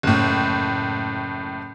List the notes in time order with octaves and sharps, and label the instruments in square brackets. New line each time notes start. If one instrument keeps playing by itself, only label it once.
[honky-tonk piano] F#1 A2